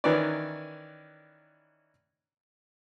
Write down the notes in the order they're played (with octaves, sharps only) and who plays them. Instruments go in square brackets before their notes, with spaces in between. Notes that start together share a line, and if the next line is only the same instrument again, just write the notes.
[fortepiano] D#3 E3 C#4 A#4 B4 D5